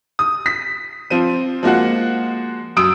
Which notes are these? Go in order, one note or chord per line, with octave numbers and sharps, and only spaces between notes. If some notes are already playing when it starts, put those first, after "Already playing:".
D#6
B6
F3 C4 D#7
F3 G#3 A#3 F#4 F#5
F#2 D#6 E6 D7